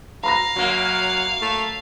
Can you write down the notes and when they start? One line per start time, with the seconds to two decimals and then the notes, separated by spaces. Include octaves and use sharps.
0.24 F5 A#5 B5 A#6
0.56 F#2 F#3 A#3
1.42 A3